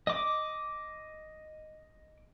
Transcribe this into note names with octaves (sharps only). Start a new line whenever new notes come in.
D#5 D6